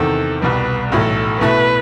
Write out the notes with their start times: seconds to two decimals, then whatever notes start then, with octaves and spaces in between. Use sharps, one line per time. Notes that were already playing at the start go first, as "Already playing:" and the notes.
Already playing: E2 C3 D#3 A4
0.42 C2 B2 G3 B4
0.92 B1 A2 E3 A4
1.41 B2 A3 E4 B4